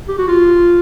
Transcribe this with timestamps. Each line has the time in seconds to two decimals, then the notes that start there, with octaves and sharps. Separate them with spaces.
0.08 G4
0.19 F#4
0.28 F4